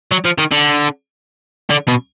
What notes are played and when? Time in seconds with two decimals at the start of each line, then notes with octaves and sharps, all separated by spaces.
0.12 F#3
0.25 F3
0.38 D#3
0.52 D3
1.70 D3
1.88 B2